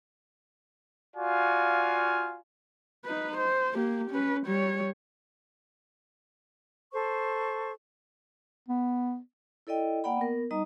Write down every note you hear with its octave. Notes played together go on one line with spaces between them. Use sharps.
F4 F#4 D5 F5 G#5
D#4 B4
C5
A#3 G4
C#4 B4
G3 C#5
A4 C5 C#6
B3
E4 A4 D5 D#5 G5
A#3 D5 F#5 G5 B5
B3 A#4
G3 D#4 D#5 A#5 D#6